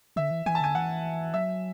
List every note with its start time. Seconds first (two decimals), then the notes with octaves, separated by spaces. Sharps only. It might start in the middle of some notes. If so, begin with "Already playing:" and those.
0.16 D3 E5
0.31 E3
0.46 E3 G#5
0.55 A5
0.61 D3 G#5
0.75 E3 F#5
1.34 F#3 E5